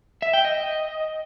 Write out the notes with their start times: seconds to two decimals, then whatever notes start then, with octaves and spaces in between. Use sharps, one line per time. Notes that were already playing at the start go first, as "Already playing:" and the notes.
0.22 E5
0.34 G5
0.45 D#5